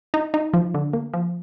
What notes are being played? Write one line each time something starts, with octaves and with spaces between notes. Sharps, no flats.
D#4
D#4
F3
D3
A#3
F3